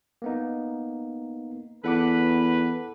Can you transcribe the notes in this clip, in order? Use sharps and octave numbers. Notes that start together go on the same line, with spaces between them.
A#3 B3 D#4
E2 A4 B4 F#5 D6